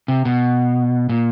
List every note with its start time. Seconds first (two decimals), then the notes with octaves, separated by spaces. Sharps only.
0.08 C3
0.25 B2
1.09 A#2